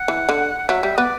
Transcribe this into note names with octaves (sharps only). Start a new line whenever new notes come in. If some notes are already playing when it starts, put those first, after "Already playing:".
Already playing: F#5
E3
D3
F#5
F#3 E5
G3 E5
B3 D5